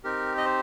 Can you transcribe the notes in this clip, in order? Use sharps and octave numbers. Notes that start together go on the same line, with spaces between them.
C4 D#4 G4 A#4
D#5
C5